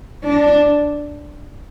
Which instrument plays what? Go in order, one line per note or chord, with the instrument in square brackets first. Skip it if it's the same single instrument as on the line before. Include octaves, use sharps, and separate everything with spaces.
[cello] D4